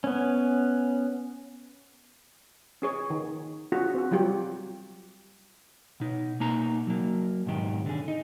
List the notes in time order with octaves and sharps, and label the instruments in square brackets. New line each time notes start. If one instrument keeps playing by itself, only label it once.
[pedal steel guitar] B3 C#4
[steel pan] C#4 G#4 C#5
D#3
C#4 D4 F4 F#4 G#4
C4 F#4
F#3 G3 F4 G4
[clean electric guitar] B2 D#4
B2 A#3 D#4 A#5
F#3 A#3
B1 G#2 D#3 G4
D3 G#4
D#4